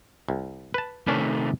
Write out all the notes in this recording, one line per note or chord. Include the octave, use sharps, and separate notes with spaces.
C2
B4 A5
C3 D#3 A3 C#4 D4 B4